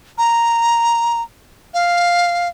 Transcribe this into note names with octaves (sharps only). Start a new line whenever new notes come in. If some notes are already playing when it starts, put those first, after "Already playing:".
A#5
F5